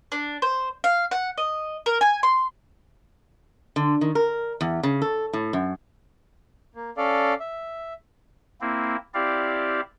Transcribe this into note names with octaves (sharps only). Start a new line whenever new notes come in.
D4
C5
F5
F#5
D#5
A#4
G#5
C6
D3
D#3
A#4
E2
C#3
A4
A2
F#2
A#3
C#4 A4 D5 F5
E5
A#3 C4 E4
C4 E4 G4 D5 F5